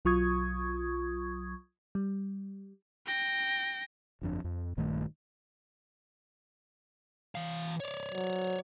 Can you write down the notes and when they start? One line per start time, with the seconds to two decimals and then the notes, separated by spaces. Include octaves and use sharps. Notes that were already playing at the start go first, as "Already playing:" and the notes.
0.05 B1 F#3 F4 C#6 D#6 G#6
1.95 G3
3.07 G5 A#6
4.22 G1 F2 D4
4.44 F2
4.77 A#1 G2 D#3 A3
7.35 E3 F5
7.80 C#5 D5
8.13 F#3